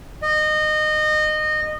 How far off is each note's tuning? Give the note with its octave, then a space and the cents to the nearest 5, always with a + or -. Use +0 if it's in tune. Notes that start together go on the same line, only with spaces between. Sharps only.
D#5 -25